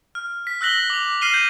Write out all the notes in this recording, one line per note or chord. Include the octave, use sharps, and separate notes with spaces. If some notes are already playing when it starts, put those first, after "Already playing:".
F6
B6
E6 F#6 A#6 F#7 G7
D6 F7
F6 C7 D#7 F#7 G7
G6